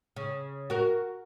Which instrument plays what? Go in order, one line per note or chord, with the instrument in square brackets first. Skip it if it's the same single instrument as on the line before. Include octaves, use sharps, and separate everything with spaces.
[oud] C#3
F#4 A#4